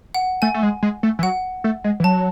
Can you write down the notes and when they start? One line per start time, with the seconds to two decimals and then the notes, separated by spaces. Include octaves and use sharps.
0.14 F#5
0.42 A3 G#5
0.54 A3
0.63 G#3
0.83 G#3
1.03 A3
1.19 E3
1.23 F#3 F#5
1.64 A3
1.84 G#3
2.00 E3
2.04 F#3 A5